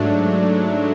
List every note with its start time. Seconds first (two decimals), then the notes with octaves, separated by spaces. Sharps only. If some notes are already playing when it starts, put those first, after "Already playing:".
Already playing: G#2 F#3 A3 D4